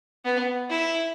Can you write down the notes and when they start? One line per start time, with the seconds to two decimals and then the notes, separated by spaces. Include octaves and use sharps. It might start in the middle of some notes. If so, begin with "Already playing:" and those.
0.25 B3
0.70 E4